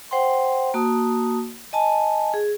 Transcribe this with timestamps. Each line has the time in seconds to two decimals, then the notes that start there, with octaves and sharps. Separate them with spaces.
0.11 C5 F#5 G5 C6
0.74 A#3 F#4 A5 D#6
1.73 D#5 G#5 A5
2.34 G#4